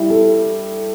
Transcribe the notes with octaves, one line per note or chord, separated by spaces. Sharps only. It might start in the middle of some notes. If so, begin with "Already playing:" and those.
Already playing: G3 E4
A4